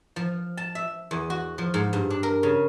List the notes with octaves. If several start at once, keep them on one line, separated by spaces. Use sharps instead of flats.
F3
A5
E5
E2
F#4
F3
G#2
G2
D4
A#4
C#3